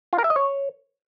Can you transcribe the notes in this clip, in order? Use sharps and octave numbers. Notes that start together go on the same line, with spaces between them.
F4
A#4
E5
D#5
C#5